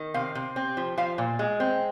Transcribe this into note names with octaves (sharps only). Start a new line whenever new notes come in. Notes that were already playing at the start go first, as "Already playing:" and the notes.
Already playing: D#3
C3 F5
C3
C4
F3
F3 F5
A#2
G#3
C4